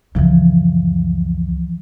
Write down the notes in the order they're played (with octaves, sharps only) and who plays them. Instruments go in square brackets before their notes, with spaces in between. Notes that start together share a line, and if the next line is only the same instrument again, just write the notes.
[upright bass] C#2 F#2 [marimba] E3 F3